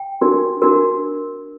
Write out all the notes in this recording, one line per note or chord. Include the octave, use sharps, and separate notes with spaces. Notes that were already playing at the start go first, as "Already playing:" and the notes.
Already playing: G5
D4 F#4 A#4
D4 F#4 A#4